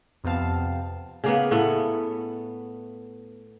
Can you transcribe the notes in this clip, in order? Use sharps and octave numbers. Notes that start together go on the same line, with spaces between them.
F2 C3 B3 C4 F5 A5
C#3 A#3 B3
A2 A3 B3